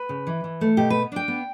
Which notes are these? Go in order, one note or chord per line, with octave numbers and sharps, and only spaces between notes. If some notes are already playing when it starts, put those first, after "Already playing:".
Already playing: B4
C#3
E3
E3
A3
B2 G4
B3 B4
D4 G5
B3